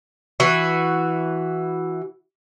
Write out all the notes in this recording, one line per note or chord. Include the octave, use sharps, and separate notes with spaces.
E3 F#4